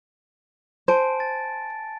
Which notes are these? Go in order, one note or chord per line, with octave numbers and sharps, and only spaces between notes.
C5 G#5 A5 D7
A6